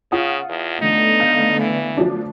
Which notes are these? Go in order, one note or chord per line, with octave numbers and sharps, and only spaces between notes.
C#3 F4 F#5 D#6
E2
D3 A3 B3 D#4
F5 G6
E3
F3 F#3 D4